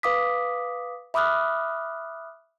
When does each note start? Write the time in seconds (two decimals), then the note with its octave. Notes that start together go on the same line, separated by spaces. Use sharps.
0.03 B4 F5 D6 D#6 B6
1.14 E5 B5 D6 D#6 F6 F#6